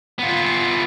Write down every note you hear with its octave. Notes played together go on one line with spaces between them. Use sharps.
B3 F4